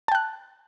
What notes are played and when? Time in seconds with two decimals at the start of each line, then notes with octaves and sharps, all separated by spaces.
0.08 A5
0.12 G5
0.15 F#6